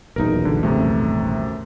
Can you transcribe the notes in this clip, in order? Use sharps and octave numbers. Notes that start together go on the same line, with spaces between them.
D#1 B1 E2 D#4 A#4
D3
F#2 C3 A3